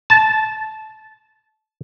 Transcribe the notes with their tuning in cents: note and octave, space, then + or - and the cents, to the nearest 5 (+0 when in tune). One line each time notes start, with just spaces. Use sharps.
A5 -15